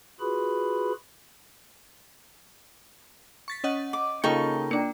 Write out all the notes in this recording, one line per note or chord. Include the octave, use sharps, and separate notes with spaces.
F4 F#4 G#4 B4 B5
C#6 A6 B6
C#4 D#5 F#5
D6
C#3 A#3 D#4 F4 A4 D#5 G5 C#6
A#3 D4 G5 C#7